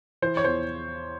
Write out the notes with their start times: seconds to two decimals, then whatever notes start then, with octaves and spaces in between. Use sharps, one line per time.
0.22 E3 C5
0.37 C#5
0.44 E2 C5